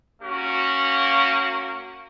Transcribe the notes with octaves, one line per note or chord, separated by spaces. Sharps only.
A#3 C#4 F#4